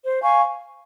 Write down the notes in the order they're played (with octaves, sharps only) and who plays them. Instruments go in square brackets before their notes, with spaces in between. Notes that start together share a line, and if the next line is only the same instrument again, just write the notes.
[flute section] C5
F5 G#5 C#6